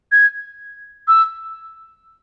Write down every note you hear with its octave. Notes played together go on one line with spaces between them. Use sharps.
G#6
E6